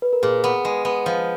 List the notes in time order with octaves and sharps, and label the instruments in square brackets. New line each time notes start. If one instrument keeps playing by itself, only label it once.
[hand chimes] B4
A#4
[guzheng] A#2 [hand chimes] G#4
[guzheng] B3
G#3
B3
F3